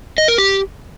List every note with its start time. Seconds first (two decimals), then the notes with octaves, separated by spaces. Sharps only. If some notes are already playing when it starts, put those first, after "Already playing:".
0.18 D#5
0.28 A#4
0.38 G4